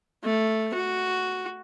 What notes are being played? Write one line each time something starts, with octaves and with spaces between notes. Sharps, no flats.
A3
F#4